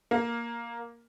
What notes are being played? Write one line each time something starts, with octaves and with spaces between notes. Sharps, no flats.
A#3